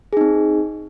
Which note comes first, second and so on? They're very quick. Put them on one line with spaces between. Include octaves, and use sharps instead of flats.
G#4 D#4 C4